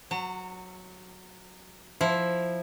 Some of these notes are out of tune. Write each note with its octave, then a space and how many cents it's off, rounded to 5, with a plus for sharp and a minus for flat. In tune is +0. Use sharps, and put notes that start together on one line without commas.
F#3 -5 A#5 -45
F3 +0 E4 +0